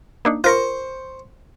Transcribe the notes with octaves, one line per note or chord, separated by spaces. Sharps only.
A#3 D4 D#4
F4 A#4 C5 C#6